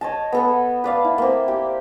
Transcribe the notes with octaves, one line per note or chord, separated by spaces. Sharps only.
C#5 D#5 A5
B3 A4 F#5
B4 D5 F5
E4
A#3 C4
G4